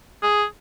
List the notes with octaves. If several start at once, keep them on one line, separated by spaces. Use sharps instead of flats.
G#4